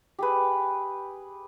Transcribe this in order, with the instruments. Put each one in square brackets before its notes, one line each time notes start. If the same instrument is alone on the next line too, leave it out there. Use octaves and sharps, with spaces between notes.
[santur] G4 G#4 B4